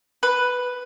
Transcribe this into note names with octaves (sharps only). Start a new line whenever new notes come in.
B4